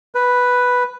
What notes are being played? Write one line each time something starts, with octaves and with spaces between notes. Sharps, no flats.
B4